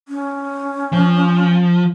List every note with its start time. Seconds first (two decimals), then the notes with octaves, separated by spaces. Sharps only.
0.08 C#4
0.93 F3